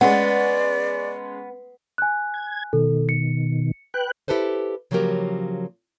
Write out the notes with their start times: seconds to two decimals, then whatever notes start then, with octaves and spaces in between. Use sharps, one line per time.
0.01 G#3 B3 C#4 D5 F#5
1.98 G#5 F#6
2.34 G#6
2.73 B2 D#3 A4
3.09 C#7
3.94 B4 G5 F#6
4.28 E4 G4 A4 B4 C5
4.91 C#3 F3 F#3 A#3 G4 A#4